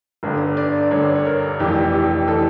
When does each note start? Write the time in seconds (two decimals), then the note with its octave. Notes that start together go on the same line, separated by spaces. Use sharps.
0.23 G1 G2 D3
0.57 D5
0.91 G1 G2 D3 C#5
1.16 C#5
1.25 A#4
1.59 F1 F2 E3 G4
1.94 G4
2.28 E3 A4